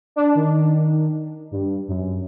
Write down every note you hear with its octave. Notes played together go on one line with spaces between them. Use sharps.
D4
D#3
G2
F#2